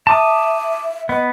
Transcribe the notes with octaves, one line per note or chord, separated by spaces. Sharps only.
E5 A5 D6 D#6
B3 D#5